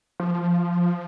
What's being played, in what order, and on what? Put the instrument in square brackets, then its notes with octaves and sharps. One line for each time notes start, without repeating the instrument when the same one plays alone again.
[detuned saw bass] F3